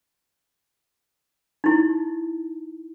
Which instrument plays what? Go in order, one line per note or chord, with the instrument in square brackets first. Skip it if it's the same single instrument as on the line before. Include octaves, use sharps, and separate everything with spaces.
[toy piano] D#4 E4